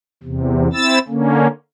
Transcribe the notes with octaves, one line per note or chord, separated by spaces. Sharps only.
E2 C3
C4 E4 E6 A6
D3 A#3 C#4